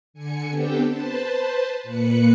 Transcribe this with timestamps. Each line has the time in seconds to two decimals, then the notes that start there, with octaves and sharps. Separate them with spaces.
0.14 D3 G#5 C#7
0.49 B3 C4 D4 G4 A4 G5
0.85 B4 C5 A5
1.83 A#2 A#3 B4 F#6 C#7